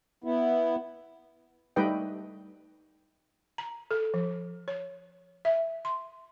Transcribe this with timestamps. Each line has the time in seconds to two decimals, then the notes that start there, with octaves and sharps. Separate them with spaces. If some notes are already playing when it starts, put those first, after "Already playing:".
0.24 B3 E4
1.76 G3 A3 D#4 B4 D#5 G5
3.58 A#5
3.91 A4
4.14 F3
4.68 C#5
5.45 E5
5.85 C6